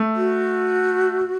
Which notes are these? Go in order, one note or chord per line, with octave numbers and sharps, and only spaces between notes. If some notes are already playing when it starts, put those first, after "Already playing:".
Already playing: A3
F#4